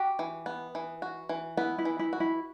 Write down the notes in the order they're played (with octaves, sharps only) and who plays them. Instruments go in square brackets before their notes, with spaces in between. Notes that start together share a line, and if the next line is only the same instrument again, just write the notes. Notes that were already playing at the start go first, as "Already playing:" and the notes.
Already playing: [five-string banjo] F#4 [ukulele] G4
[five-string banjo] E3
B3
E3
F#4
E3
[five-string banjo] B3 [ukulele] E4
[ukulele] E4
[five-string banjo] E3
[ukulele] E4
[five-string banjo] F#4
[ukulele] E4